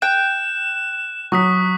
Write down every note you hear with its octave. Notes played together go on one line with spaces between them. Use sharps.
G5 F#6 E7
F#3 C#6 D#6 B6